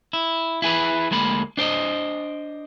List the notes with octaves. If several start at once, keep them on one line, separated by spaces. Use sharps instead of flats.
E4
E4 G#4 B4
D2 G#3 A#3 B5
D4 C5 D5 D#5